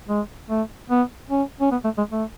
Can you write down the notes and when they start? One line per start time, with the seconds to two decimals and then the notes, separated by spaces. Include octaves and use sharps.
0.08 G#3
0.49 A3
0.90 B3
1.30 C#4
1.61 C#4
1.72 B3
1.84 A3
1.98 G#3
2.11 A3